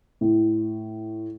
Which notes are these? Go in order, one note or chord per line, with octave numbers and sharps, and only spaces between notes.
A2